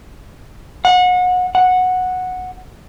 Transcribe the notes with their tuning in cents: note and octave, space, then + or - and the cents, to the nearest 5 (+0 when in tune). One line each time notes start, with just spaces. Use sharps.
F#5 -30
F#5 -10